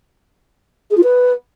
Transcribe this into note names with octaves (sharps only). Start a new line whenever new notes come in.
G#4
F4
B4